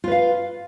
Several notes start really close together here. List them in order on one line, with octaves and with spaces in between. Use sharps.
F4 B4 F5